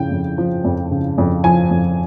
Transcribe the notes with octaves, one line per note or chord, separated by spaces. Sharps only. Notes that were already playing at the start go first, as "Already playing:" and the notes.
Already playing: F2 C#3 G5
F2
F3
F2
C#3
F2
F3 G#5
F2